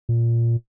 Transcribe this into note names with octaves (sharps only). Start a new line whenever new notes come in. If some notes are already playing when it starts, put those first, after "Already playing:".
A#2